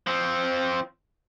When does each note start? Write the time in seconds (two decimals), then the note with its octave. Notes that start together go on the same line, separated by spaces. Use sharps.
0.07 F3 C4